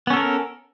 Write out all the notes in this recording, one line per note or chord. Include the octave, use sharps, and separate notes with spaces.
B3 C#4 A4 A#4